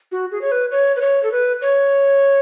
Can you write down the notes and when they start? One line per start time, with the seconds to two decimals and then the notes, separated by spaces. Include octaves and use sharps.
0.12 F#4
0.32 G#4
0.41 C#5
0.52 B4
0.71 C#5
0.96 B4
1.01 C#5
1.23 A4
1.32 B4
1.61 C#5